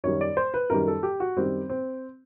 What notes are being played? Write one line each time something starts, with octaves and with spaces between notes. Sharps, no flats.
F#2 D#3 G3 C#5
D5
C5
B4
F#2 D#3 G3 A#4
A4
G4
F#4
F#2 D#3 G3 C4
C4